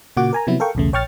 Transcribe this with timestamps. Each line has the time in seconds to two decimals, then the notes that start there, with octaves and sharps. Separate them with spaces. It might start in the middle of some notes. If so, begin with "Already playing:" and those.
0.17 A#2 C#3 A#3 F#4 F#5 D6
0.33 A#4 G#5 A#5
0.47 C3 F3 F#3 B3 E4
0.60 A4 A#4 F5 G5 C#6
0.75 B1 E2 C#3 A3
0.93 A#1 C#5 G5 C#6 F6 A6